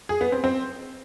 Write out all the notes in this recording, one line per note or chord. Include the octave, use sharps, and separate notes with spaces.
G#4
B3
C4
C4